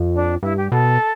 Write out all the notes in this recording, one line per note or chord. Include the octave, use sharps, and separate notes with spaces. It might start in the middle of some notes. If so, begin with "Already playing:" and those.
Already playing: F2
D4
G2 E4
G4
B2 A4